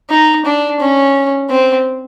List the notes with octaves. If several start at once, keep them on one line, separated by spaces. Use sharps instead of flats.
D#4
D4
C#4
C4